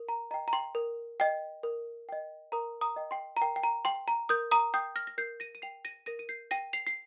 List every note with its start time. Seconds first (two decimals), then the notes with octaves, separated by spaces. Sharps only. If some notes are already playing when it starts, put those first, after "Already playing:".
Already playing: A#4
0.09 A#5
0.31 D#5 A#5
0.34 G5
0.48 A#5
0.53 G5 C6
0.75 A#4
1.20 D#5 G5
1.63 A#4
2.09 D#5 G5
2.52 A#4 A#5 D#6
2.81 A#5 D#6
2.96 D#5 G5
3.11 G5 C6
3.37 A#5
3.41 A#4 G5
3.56 G5
3.64 A#5
3.85 G5 C6
4.08 A#5
4.29 A#4 D#6 G6
4.51 A#5 D#6
4.74 G5 D#6 G6
4.96 F6 A#6
5.07 A#6
5.18 A#4 G6 C7
5.40 A#6 D#7
5.55 D#7
5.62 G5 C7 F7
5.85 A#6 D#7
6.06 A#4 A#6 D#7
6.19 D#7
6.29 G6 C7
6.51 G5 A#6 D#7
6.73 C7 F7
6.87 C7